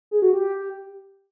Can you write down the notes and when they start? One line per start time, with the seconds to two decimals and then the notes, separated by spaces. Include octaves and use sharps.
0.11 G#4
0.22 F#4
0.33 G4